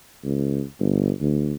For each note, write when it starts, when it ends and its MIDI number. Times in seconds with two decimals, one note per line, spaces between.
0.24 0.62 37
0.80 1.12 31
1.21 1.54 38